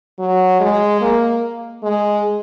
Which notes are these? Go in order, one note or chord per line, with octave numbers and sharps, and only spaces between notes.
F#3
G#3
A#3
G#3